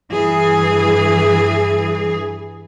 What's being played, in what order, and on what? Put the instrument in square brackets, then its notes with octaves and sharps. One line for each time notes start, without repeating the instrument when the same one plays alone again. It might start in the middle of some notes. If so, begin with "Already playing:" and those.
[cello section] G2 E3 G#4